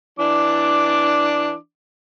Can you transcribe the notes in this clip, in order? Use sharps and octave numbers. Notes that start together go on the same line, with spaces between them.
E3 D4 D6